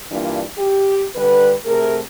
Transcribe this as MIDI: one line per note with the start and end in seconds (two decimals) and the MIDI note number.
0.11 0.43 43
0.11 0.43 52
0.11 0.43 58
0.11 0.43 62
0.11 0.43 65
0.58 1.06 67
1.16 1.53 50
1.16 1.53 55
1.16 1.53 71
1.66 1.99 48
1.66 1.99 57
1.66 1.99 68
1.66 1.99 70